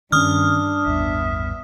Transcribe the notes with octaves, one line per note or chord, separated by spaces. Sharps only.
G2 D#3 C#4 D4 D#6 F6
A1 E2 G2 B3 E5